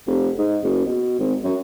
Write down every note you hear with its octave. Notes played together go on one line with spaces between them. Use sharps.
F1
G#2
F#1
B2
G#1
F#2